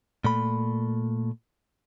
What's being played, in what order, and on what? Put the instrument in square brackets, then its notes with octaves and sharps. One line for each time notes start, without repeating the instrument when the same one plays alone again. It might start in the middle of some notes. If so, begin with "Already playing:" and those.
[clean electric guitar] A#2 A3 B5